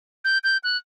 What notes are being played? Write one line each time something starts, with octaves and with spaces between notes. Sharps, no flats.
G6
G6
F#6